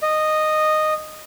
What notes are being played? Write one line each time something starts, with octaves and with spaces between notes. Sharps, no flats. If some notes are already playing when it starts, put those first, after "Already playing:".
D#5